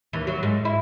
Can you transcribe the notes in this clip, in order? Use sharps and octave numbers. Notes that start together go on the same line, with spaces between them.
D#2 E3
F#3
G#2
E4